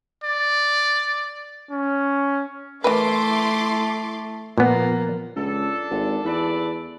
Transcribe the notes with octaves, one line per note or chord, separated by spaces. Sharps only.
D5
C#4
E3 A3 E4 A#4 B4 C6 D6
A#2 F3 A#3 B3
C#2 D4 A4
G#1
E2 A4 B4 D5